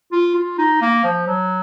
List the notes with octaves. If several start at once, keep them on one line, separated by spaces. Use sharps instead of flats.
F4
F4
D#4
A#3
F3
F#3